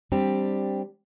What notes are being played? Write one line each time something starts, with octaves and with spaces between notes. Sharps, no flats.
G3 C4 D4 G4